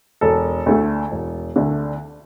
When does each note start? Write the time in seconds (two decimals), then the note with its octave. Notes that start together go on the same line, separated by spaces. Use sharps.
0.21 E1 A4
0.66 D2 D3 A3
1.11 E1
1.56 D2 D3 A3